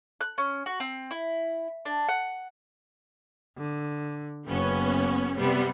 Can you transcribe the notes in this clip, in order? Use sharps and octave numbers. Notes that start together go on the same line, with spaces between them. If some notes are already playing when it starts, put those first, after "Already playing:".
F#6
C#4
F#4
C4
E4
D4
F#5
D3
F#1 B3 C#4
C3 G3 B3